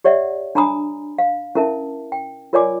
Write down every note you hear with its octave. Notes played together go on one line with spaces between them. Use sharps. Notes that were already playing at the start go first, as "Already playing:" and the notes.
G4 C#5 D5 E5 F#5
D4 G#5 A#5 B5 D#6
F5
C#4 E4 A#4 E5 A5
G5
F4 A#4 C#5 D5 G#5 D6